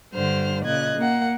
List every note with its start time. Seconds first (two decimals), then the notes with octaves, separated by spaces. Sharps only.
0.14 G2 D3 C5 F6
0.64 A#2 C#3 D#5 F#6 G#6
0.97 A#3 F#5